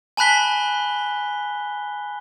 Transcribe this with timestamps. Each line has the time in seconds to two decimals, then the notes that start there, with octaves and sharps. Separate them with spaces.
0.17 G#5 A5 B5 F#6 B6 G7